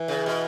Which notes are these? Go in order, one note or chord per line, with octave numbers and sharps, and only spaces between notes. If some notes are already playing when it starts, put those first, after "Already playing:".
Already playing: E3
C#3
B2